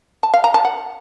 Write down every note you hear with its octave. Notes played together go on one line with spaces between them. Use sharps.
A5
F5
A#5
A5
F#5